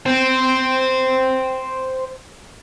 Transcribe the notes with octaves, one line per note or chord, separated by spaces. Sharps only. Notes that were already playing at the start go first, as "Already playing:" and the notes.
C5 G5